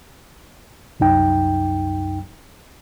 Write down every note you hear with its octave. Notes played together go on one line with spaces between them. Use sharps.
C2 F#2 D#4 G5